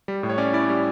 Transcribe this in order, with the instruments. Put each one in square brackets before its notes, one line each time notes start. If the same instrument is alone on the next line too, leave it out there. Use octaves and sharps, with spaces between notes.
[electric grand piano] G3
A2
C#5
C#4 D5
E4 D5
G3